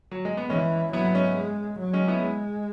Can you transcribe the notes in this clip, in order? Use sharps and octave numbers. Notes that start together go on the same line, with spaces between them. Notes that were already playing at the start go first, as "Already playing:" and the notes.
F#3
G#3
B3
E3 G#3 C#4
F#3 B3 E4
B3
G#3 C#4
G#3
F#3
G#3 C#4
B3 E4
G#3